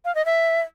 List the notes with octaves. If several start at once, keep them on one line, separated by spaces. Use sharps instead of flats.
F5
D#5
E5